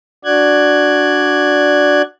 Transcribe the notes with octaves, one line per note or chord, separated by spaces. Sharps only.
D4 F#4 D5 F#6 G#6